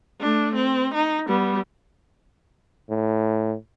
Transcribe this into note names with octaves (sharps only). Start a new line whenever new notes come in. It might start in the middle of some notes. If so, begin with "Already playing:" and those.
A3 D4
C4
D#4
G3 B3
A2